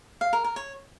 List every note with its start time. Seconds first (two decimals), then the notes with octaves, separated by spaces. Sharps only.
0.21 F5
0.33 A#4
0.44 A#4
0.56 C#5